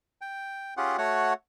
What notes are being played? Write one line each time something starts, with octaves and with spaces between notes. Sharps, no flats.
G5
C#4 F4 G4 G#4 F#5
A3 F#4 C#5 F#5